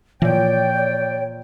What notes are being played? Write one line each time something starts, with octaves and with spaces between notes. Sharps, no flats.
A#2 E3 F3 C#5 D5 G5